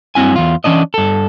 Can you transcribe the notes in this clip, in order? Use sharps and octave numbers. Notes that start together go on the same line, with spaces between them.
G2 F#3 C4 E4 G#5
E2 F4
E3 C#4 D4 D#5
G2 A4